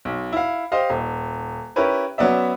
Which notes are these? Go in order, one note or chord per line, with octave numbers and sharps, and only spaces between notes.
B1
E4 F5
G4 C5 D#5 F5
D#1
C#4 E4 G4 A#4 B4 C#5
F#3 B3 C#4 D5 E5